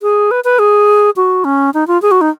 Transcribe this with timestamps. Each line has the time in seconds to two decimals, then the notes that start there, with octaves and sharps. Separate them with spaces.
0.02 G#4
0.31 B4
0.44 B4
0.59 G#4
1.16 F#4
1.45 C#4
1.74 D#4
1.87 F4
2.02 G#4
2.11 F#4
2.21 D#4